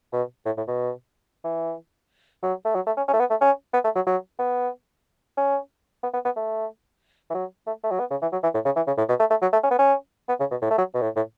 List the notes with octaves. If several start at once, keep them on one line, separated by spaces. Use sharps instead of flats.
B2
A2
A2
B2
E3
F#3
A3
F#3
A3
C#4
C#4
A3
B3
A3
C#4
B3
A3
F#3
F#3
B3
C#4
B3
B3
B3
A3
E3
F#3
A3
A3
F#3
B3
C#3
E3
F#3
E3
A2
C#3
E3
C#3
A2
B2
A3
A3
F#3
A3
C#4
B3
C#4
B3
C#3
B2
A2
A3
F#3
B2
A2
A2